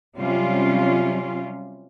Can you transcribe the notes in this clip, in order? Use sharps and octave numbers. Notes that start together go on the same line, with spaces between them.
C3 F#3 G3 C#4 F4